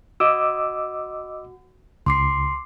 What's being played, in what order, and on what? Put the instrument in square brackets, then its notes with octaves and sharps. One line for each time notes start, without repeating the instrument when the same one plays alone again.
[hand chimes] F#4 [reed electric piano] D#5 D6 E6
[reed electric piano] C#2 [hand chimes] C6 D6 C7